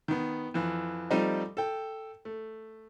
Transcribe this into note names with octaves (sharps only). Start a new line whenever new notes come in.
D#3 B3
F2 E3
F3 G3 A3 C4 D#4 D#5
A4 G5
A3